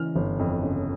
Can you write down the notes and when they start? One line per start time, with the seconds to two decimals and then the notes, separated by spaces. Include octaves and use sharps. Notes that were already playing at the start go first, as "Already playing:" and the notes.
Already playing: C#3 E3 F6
0.16 G1
0.39 F2
0.63 C#3